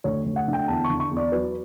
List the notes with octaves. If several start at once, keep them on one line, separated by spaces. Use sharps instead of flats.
D2 C#5
D2
F#5
D3
G5
E2 A5
C#6
D3
C#6
E2
D5
F#3 B4